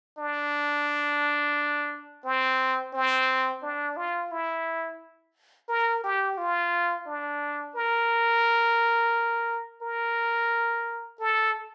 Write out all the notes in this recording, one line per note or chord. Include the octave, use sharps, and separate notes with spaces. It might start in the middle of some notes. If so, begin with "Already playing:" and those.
D4
C4
C4
D4
F4
E4
A#4
G4
F4
D4
A#4
A#4
A4